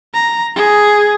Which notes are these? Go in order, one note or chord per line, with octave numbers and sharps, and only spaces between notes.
A#5
G#4